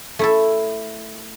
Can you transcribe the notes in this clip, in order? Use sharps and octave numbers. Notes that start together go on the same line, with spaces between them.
A3 E4 A4